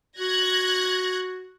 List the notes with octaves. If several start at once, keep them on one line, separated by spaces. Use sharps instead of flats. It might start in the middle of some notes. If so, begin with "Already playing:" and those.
F#4 F#6 G#6 A#6